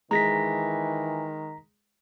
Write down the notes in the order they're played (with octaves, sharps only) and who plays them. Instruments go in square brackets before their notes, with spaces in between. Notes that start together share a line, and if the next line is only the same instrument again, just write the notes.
[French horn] D#3 [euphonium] E3 [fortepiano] G#3 [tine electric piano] A#5 A#6 B6